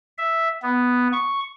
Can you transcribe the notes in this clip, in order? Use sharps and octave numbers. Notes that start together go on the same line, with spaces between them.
E5
B3
C#6